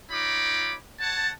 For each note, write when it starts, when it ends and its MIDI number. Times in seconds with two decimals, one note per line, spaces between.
0.11 0.75 63
0.11 0.75 65
0.11 0.75 73
0.11 0.75 83
0.11 0.75 86
1.00 1.31 73
1.00 1.31 78
1.00 1.31 81